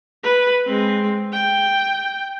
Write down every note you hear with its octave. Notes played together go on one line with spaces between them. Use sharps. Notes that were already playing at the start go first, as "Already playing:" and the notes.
B4
G#3 C4
G5